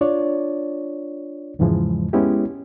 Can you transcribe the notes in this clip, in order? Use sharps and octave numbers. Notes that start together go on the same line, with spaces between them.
D4 F4 C#5 D5
E2 G#2 C#3 E3 F3 G#3
G#3 B3 C#4 E4 G4